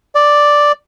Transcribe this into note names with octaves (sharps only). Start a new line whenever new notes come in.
D5